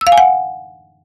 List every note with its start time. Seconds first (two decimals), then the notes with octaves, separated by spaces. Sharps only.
0.01 E6
0.07 F5
0.12 G#5
0.18 F#5